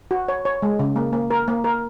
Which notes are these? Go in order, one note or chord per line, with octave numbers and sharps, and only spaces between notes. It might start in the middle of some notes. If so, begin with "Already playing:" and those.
F#4
C#5
C#5
G#3
C#3
A#3
A#3
A#4
A#3
A#4